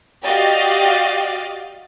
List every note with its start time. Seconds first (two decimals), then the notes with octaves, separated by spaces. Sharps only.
0.24 F#4 G4 D5 D#5 F5 A6